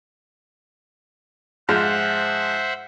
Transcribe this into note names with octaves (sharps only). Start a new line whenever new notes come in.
G#2 F3 G#3 C5 E5 F#5